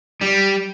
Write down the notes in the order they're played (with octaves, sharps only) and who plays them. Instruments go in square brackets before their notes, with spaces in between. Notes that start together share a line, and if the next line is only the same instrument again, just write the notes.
[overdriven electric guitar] G3